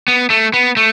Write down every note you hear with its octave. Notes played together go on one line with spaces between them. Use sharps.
B3
A3
B3
A3